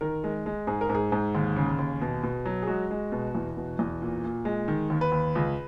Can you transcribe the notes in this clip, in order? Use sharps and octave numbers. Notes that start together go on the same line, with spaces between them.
D#3 A#4
G#3
G#3
G#2 G#4
A#4
G#2
G#4
G#2
D#2
C#3
D#2
B2
B2
F#3
G#4
G#3 F#4
G#3
B2
E2
B2
E2
A#2
A#2
G#3
D#3
D#2
B4
D#2
C#2